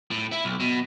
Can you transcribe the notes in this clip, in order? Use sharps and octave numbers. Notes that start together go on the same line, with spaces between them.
A2
E4
B1
B2